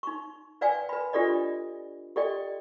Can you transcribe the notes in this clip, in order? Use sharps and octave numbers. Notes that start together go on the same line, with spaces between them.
D#4 C#6
B4 D5 F5 G5 G#5
B4 B5
D4 F4 G4 A4 D5 D#5
G4 A4 D5 D#5 G5